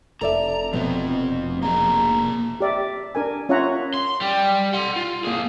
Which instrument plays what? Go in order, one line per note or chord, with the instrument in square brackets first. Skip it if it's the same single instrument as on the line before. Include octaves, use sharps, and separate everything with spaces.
[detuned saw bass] F1 [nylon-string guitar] A4 D5 E5 [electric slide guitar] A#5
[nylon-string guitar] B2 [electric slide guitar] F3 C4
[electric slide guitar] A#3 G#4 [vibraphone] A#5
[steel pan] G4 D5 E5
D4 A#4 G#5
C#4 F4 C#5 E5 F#5 A#5
[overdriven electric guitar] C6
G3 G4
F#5 C6
F4
A#3 G#4